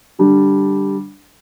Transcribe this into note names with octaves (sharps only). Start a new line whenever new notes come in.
D3 G3 D4